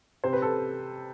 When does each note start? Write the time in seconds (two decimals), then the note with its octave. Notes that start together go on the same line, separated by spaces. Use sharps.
0.24 C3 C5
0.33 B4
0.42 A4